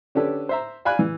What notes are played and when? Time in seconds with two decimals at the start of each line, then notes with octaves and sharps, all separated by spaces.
0.15 D3 C#4 D4 G4 A4 B4
0.49 C5 E5 A#5
0.85 D5 F5 G#5 B5 F#6
0.99 E3